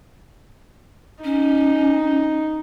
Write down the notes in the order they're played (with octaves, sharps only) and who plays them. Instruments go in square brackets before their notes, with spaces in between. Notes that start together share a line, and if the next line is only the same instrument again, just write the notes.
[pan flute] C#4 [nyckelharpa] D#4